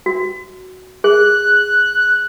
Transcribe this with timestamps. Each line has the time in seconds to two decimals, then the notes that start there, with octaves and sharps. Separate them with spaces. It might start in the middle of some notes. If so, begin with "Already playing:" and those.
0.06 F#4
1.04 G#4 F#6